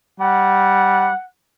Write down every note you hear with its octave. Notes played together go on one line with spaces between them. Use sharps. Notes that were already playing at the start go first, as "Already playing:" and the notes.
G3 F#5